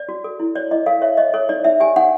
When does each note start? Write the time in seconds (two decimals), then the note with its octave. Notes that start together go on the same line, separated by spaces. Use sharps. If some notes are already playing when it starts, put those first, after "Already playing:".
Already playing: D5
0.09 F#4
0.24 A4
0.40 E4
0.56 C#5 D5
0.71 E4 D#5
0.86 A4 F5
1.02 C#5 E5
1.17 C#5 D#5
1.34 A4 C#5
1.49 D#4 D5
1.64 D#4 E5
1.80 G4 G#5
1.96 D#4 F#5